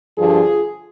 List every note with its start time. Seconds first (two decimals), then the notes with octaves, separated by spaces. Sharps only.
0.17 G2 D3 F3 F4 G#4